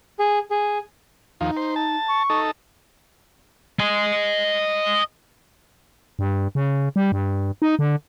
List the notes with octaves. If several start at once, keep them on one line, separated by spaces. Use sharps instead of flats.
G#4
G#4
D#2 F3 D#4
C5
A5
C#6
D#4 A4
D#5 G#5
G2
C#3
G3
G2
D#4
D3